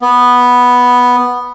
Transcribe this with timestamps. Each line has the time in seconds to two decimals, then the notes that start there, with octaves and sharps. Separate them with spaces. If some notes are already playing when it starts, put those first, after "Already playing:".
0.02 B3